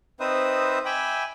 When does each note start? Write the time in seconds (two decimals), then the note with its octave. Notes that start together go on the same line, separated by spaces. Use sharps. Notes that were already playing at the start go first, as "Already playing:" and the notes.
0.20 C4 D#4 B4 C5 E5 D#6
0.85 E5 G5 G#5 B5 D6